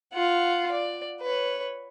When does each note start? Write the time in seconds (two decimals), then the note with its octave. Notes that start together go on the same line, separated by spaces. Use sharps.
0.13 F4 F#5
0.72 D5
1.21 B4 C#5